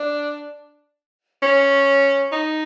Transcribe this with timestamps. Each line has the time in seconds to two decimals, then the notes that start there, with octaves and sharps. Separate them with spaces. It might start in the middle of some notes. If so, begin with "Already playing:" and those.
Already playing: D4
1.42 C#4
2.32 D#4